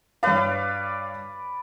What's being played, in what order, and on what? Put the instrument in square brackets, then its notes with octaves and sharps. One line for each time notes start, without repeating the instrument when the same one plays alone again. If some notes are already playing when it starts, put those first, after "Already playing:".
[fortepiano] G2 C#5 F5 [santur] B4 D5